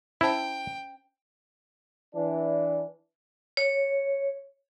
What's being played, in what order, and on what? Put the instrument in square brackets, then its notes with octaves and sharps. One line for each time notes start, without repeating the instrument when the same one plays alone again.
[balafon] C#4 C5 A5 [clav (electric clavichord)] E4 [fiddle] G5
[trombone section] E3 D4
[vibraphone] C#5